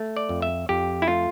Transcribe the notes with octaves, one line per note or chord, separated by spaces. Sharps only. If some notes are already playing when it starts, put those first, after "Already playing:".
Already playing: A3
D5
F2
E5
F2 G4
E4
A3 F4